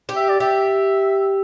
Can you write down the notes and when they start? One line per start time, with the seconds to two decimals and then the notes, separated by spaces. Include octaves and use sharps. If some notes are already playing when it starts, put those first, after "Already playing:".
0.09 G4
0.16 E5
0.29 D5
0.40 G4 E5